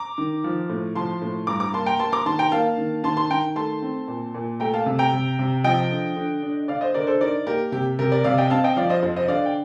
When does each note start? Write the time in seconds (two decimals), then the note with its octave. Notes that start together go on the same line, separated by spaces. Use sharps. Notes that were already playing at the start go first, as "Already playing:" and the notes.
Already playing: A#5 D6
0.18 D#3
0.44 F3
0.70 A2
0.95 F3 A5 C6
1.22 A2
1.47 G2 A#5 D6
1.60 A#5 D6
1.73 A#3 A5 C6
1.86 G5 A#5
1.99 A#3 A5 C6
2.12 A#5 D6
2.26 D#3 A5 C6
2.39 G5 A#5
2.52 A#3 F5 A5
2.78 D#3
3.03 D#3 A5 C6
3.17 A5 C6
3.30 D#3 G5 A#5
3.56 A3 A5 C6
3.82 C4
4.08 A#2
4.34 A#2
4.60 A3 G5 A#5
4.74 F5 A5
4.86 C3
4.99 G5 A#5
5.13 C3
5.39 C3
5.64 F3 D#5 G5
5.91 D3
6.16 D3
6.42 D4
6.68 D3 D5 F5
6.81 C5 D#5
6.94 D3 A#4 D5
7.07 A4 C5
7.21 D#4 A#4 D5
7.46 A#3 G4 A#4
7.72 C3 G4
7.99 C3 G4 A#4
8.12 A#4 D5
8.24 C3 D5 F5
8.38 D#5 G5
8.50 C4 F5 A5
8.64 D#5 G5
8.77 F3 D5 F5
8.89 C5 D#5
9.02 F2
9.16 C5 D#5
9.28 D3 D5 F5
9.46 G5